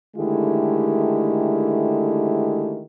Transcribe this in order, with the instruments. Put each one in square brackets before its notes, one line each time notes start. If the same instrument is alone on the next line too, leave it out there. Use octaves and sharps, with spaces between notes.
[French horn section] D3 D#3 G#3 A3 E4 G4